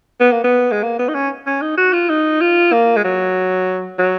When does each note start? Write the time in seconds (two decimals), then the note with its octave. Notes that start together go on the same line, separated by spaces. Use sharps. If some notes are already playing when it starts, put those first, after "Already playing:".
0.20 B3
0.32 A#3
0.44 B3
0.71 G#3
0.83 A#3
0.99 B3
1.08 D#4
1.14 C#4
1.47 C#4
1.62 D#4
1.77 F#4
1.93 F4
2.09 D#4
2.41 F4
2.72 A#3
2.96 G#3
3.04 F#3
3.98 F#3